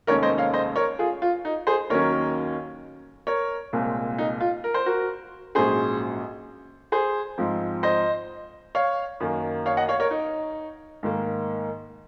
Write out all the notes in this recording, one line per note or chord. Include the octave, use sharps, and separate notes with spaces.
F1 D#2 D#3 G#3 C#4 A#4 C#5
C5 D#5
C#5 F5
C5 D#5
A#4 C#5
F4 G#4
F4
D#4
G#4 C5
D#2 D#3 F#3 C#4 A#4 C#5
A#4 C#5
C2 A#2 G#3 C4
D#4
F4
A#4
C5
F#4 A#4
A#1 G#2 F#3 C#4 G#4 C5
G#4 C5
G#2 F3 C4
C5 D#5
C#5 F5
F#2 D#3 A#3
C#5 F5
D#5 F#5
C#5 F5
A#4 C#5
D#4
G#2 D#3 A#3